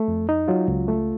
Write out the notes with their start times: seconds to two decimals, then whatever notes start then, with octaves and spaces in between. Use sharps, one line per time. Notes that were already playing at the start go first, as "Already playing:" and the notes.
Already playing: A3
0.08 F2
0.29 D#4
0.48 F#3 F4
0.68 C#2
0.88 A3